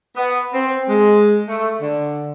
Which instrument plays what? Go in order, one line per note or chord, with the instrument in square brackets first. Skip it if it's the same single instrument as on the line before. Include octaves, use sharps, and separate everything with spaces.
[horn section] B3
C4
G#3
A3
D3